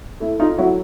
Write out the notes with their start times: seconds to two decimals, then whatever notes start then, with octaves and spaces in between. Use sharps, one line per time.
0.20 A3 E4
0.39 D#4 F4
0.58 F#3 E4 F#4